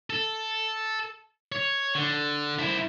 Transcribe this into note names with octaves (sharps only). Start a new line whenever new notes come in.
A4
C#5
D3
E4 C5